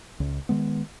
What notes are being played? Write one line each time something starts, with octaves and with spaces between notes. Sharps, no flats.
C#2
D#3 G#3 B3